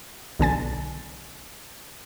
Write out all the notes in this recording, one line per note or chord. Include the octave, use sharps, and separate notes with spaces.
B1 D3 G#5 A6